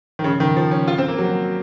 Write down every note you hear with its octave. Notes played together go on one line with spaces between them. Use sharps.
D#3
C#3
D#3
F3
C#4
F4
C4
A#3
F#3